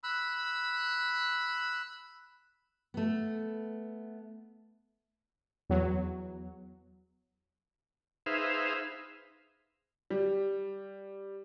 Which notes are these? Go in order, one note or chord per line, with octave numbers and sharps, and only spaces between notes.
B5 E6 F#6
A3 B3
E2 F#3
D#4 G#4 B4 C5 E5 F5
G3